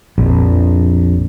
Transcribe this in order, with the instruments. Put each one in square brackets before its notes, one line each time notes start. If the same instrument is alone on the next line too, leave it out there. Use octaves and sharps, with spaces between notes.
[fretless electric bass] A#1 F2